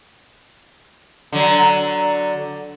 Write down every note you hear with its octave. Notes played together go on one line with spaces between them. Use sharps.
D3 F#3